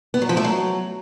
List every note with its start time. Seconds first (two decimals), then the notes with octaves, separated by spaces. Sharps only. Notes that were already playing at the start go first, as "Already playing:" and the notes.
0.14 B3
0.22 F#3
0.29 F3
0.37 A3
0.44 F#3